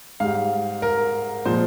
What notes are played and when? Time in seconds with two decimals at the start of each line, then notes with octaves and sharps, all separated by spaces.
0.20 G#2 G3 F5
0.82 A#4
1.45 A#2 F3 G#3 C5